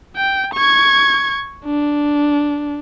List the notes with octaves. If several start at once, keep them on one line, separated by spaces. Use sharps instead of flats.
G5
C#6 G#6
D4